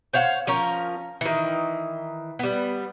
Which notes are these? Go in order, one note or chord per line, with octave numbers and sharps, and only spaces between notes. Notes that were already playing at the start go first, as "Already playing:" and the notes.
C5 C#5 F5 F#5
F3 C#4 A#4
D#3 E3
G3 B3